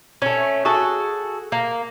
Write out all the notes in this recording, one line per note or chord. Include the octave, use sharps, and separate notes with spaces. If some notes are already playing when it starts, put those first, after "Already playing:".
A3 C#4
F#4 G#4 A4
A#3